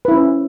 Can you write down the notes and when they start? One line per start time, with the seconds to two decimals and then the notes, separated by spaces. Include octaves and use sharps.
0.05 B4
0.08 E4
0.12 C#4
0.15 C5